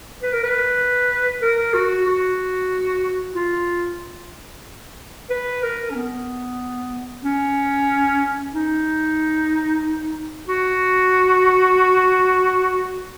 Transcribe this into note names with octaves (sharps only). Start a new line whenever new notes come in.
B4
A#4
B4
A#4
F#4
F#4
F4
B4
A#4
C#4
B3
C#4
D#4
F#4